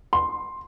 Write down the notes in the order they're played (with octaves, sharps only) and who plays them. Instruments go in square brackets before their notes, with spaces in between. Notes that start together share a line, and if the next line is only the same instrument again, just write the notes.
[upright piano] C6